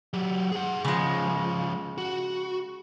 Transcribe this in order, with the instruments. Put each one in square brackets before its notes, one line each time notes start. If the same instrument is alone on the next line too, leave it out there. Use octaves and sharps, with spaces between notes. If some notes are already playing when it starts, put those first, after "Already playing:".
[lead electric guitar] F#3 G4
G#4 F#5
[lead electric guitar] C#2 F3 [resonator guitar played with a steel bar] C#3 G#3
[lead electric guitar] F#4